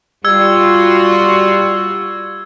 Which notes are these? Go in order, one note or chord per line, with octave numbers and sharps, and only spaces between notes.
G3 F4 F#4 E6 G#6